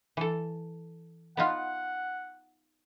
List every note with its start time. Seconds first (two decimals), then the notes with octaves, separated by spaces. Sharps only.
0.17 E3 A4
1.37 B3 D#4 F4 F#5